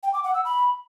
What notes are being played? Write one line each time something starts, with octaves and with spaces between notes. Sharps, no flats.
G5
D6
F#5
E6
B5